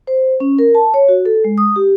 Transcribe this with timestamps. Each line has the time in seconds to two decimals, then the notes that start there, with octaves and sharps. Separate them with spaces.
0.07 C5
0.40 C#4
0.59 A#4
0.75 A5
0.94 C#5
1.09 F#4
1.25 A4
1.44 G#3
1.58 D#6
1.76 G4